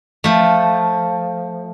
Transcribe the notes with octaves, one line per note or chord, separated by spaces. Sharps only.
F3 A3